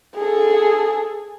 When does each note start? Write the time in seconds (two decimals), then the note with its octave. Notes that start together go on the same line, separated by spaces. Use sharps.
0.17 G#4 A4